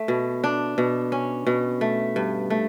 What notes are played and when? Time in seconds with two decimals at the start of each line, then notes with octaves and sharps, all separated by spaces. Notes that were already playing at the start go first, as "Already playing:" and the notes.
Already playing: A3
0.08 B2
0.44 D4
0.78 B2
1.12 C#4
1.47 B2
1.81 A3
2.16 G2
2.50 A3